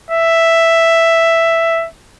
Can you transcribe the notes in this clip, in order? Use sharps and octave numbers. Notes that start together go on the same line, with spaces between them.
E5